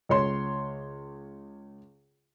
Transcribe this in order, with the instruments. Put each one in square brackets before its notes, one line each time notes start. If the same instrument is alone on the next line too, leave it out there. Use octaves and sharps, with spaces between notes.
[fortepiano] C#2 C#5 C6